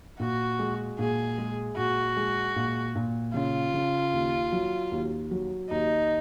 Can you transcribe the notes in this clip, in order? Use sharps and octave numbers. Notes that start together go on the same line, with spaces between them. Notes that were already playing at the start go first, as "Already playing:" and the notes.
A#2 F#4
G#3
A#2 G#4
G#3
A#2 F#4
G#3
A#2
A#2
C#3 F4
C#3
D#2
F#3
D#2
F#3
D#2 D#4